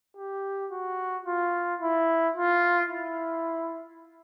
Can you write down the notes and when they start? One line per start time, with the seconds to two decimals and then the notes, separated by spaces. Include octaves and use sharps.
0.17 G4
0.71 F#4
1.27 F4
1.81 E4
2.36 F4
2.90 E4